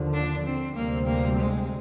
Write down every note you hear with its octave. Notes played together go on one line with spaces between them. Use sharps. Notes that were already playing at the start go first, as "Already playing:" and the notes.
Already playing: D#2 D3 F3
D4
C4
D2 C3 G3 A#3 C4
A#3
G#3